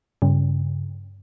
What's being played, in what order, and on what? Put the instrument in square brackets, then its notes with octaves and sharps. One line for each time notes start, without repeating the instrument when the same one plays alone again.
[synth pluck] G2 C#3